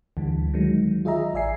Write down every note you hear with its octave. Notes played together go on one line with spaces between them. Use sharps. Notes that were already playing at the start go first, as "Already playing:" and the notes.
D2 D3 E3 G3
D#3 F#3 G#3
F4 G#4 D#5 E5 A#5
A1 D5 E5 G#5 C7